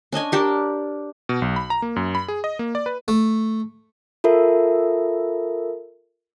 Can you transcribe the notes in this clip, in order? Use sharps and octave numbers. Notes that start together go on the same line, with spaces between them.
C#4 D4 D#5 G#5
D4 G4 A#4
B2
B1
B5
A#5
A#3
F#2
B5
G#4
D#5
A#3
D5
B4
A3
F4 A4 A#4 E5